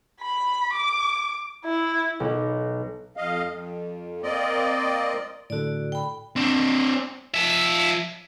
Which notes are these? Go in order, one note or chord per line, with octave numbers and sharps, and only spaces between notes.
B5
D6
E4
B1
F2 D#5 F5
F2
A#3 C4 D5 D#5
A2 D3 F#4 A4 D5
G5 B5
C4 D4
F3 E5